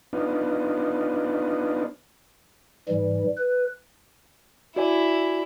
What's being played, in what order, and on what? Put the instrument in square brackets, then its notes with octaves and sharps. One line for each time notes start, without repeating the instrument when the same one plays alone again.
[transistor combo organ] B3 D4 D#4 F4
[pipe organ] G#2 E3 G3
B4
[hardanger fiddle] E4 [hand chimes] F#4 D5 G#5